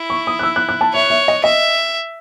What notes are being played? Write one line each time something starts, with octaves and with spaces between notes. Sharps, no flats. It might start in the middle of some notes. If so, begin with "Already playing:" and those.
Already playing: E4
C#6
D#6
F#6
E6
F#6
F#6
A5
C#5 E5
E5
D#5
D#5 E5